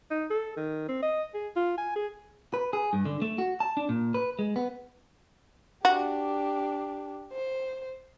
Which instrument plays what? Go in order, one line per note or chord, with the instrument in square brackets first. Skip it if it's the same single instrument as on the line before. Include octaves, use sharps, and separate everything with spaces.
[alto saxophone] D#4
A4
D#3
C4
D#5
G#4
F4
G#5
G#4
[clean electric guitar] B4
G#4
G2
D3
A3
F#4
A5
D4
A#2
B4
G#3
B3
[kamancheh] D4 G4 [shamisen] F#4
[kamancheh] C5